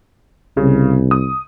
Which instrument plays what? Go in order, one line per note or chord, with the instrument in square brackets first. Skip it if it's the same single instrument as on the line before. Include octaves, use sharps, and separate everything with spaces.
[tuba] C2 [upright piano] C#3
[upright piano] D#6